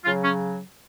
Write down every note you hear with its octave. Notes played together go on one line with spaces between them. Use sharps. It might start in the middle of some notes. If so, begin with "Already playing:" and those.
C#3 F#3 F4
C#4